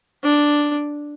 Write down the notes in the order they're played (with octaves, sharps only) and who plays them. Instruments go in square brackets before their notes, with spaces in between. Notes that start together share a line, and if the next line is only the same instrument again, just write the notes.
[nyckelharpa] D4